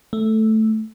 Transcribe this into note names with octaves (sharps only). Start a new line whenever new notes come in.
A3